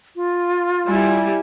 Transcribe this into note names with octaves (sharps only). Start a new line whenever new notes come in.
F4
G3 E4 G#5